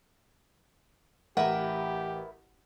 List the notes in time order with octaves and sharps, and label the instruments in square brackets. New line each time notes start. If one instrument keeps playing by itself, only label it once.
[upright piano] A1 [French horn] G4 [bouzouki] A#4 B4 E5 [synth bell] F#5